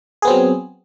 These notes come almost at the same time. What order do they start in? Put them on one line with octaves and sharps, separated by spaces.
G#4 B3 C4 F#3